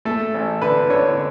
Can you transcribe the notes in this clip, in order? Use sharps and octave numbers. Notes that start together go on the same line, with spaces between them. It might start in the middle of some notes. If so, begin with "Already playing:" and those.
A3 A4
A1
D3 B4
D3 C#5